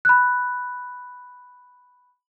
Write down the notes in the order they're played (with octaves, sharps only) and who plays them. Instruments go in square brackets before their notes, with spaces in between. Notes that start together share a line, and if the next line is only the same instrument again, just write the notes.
[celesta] B5 F#6